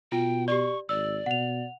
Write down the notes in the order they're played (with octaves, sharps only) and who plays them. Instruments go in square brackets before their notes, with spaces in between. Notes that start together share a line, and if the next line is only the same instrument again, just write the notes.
[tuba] B2 [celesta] F4 [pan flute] G5
[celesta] G4 D5 [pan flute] C#6
[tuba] G#1 [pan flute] D5 [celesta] E6
[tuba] B2 [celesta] F#5 F7